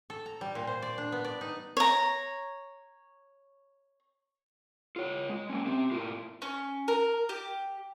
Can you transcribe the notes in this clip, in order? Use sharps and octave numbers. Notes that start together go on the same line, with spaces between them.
A4
A#5
G3
A#2
C5
D5
D4
B3
D5
D#4
C#5 A#5
F4 C#5
G#3
A#3 C#4
C4 G4
A2 F4
C#4
A#4
G4